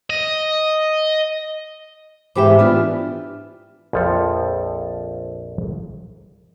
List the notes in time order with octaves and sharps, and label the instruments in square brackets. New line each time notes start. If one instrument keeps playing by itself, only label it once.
[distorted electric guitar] D#5
[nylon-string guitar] G#2 E3 G4 [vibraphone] E5 D6
[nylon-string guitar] E3 B3 D4 [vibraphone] F4
[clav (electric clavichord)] A#1 F2 F3 A4